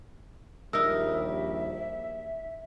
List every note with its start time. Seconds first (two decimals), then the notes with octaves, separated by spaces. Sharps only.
0.73 A#1 D#2 G3 D#4 A#4 E5 E6